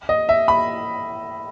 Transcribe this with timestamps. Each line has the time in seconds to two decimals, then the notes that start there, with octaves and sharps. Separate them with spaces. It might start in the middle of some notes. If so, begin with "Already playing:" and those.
0.09 D#5
0.29 E5
0.48 B5